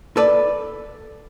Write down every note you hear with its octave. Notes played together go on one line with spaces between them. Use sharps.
A4 B4 D5